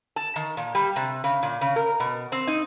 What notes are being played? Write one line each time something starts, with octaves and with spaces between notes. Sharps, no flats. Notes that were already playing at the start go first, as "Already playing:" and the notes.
A5
D#3
A#2
G3
C3
C#3
A#2
C#3
A#4
B2
C4
D#4